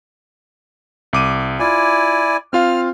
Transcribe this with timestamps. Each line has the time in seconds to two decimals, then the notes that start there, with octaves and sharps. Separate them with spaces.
1.13 C2 D6 D#7
1.59 E4 F4 D5 G#5
2.53 C4 F4 F5 F6